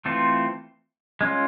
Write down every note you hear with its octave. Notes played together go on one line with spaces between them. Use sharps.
E3 A3 C4 F4 A4
G#3 C#4 F4